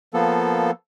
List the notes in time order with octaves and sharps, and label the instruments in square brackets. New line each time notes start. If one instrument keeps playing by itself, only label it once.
[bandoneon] F3 A#3 B3 A4